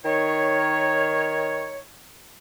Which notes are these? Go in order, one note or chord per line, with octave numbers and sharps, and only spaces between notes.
D#3 C#5